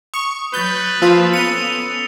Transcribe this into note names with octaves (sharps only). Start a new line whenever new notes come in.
C#6 D#6
F#3 B4 F#6 G6 A6
F3 A#3 F4 E6 B6 E7
B3 C#4 A4 C#7 D#7 F7 G7